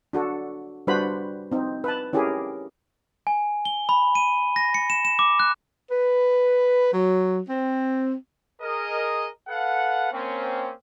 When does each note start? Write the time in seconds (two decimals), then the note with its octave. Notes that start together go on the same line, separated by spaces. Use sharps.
0.13 D4 F#4 A4
0.87 G3 D4 F#4 B4 C5 B5
1.52 C4 D#4
1.84 B4 A5
2.13 C#4 E4 G4 G#4 A#4
3.27 G#5
3.65 G7
3.89 B5
4.15 D#7
4.56 A#6
4.74 C#7
4.90 E7
5.05 E7
5.19 D6
5.40 F#6
5.91 B4
6.92 F#3
7.48 C4
8.62 G#4 A#4 D#5
9.49 A4 B4 F5 F#5
10.12 A#3 C4 C#4